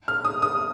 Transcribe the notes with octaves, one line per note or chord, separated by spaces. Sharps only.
F6
D#6
D#6